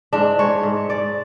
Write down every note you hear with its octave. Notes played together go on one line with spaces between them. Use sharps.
G#2 D4
G#2 C#5
G#2
G#2 D5